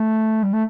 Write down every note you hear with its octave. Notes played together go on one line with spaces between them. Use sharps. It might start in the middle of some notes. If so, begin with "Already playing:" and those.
Already playing: A3
G3
A3